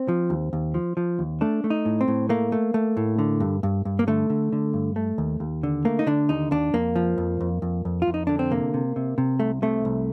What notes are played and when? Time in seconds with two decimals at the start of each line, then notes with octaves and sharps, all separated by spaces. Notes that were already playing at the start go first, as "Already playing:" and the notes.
Already playing: C4
0.08 F3
0.30 D#2
0.53 D#2
0.74 F3
0.97 F3
1.19 D#2
1.41 A3 D4
1.64 A3
1.70 D#4
1.85 A2
2.01 C4
2.08 A2
2.29 A3 A#3
2.52 A3
2.74 A3
2.97 A2
3.19 D3
3.40 G2
3.63 G2
3.85 G2
3.99 A#3
4.07 D3 A3
4.30 D3
4.52 D3
4.74 G2
4.96 A3
5.18 D#2
5.40 D#2
5.63 D3
5.85 A3 A#3
5.99 D#4
6.07 D3 D4
6.29 D#2 D#4
6.51 D#2 D4
6.74 F2 A#3
6.96 F3
7.18 F2
7.41 F2
7.62 F2
7.85 F2
8.02 F4
8.07 F2
8.14 D#4
8.27 D3 D4
8.39 C4
8.51 C3 A#3
8.74 C3
8.96 C3
9.18 C3
9.40 C2 A3
9.62 C3 A3
9.85 C2